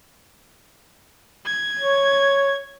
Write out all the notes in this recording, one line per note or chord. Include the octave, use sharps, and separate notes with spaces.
G#6
C#5